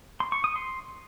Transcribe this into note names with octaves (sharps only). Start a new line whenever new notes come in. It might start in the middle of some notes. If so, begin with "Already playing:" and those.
C6
C#6
D#6
C6